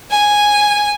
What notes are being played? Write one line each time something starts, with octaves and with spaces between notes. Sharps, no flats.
G#5